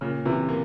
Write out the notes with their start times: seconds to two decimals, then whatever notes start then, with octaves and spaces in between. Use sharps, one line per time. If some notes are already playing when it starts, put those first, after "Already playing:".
0.01 A#2 C#3
0.25 C3 E3
0.49 A#3